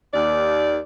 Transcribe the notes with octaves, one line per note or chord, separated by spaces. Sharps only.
D#2 D5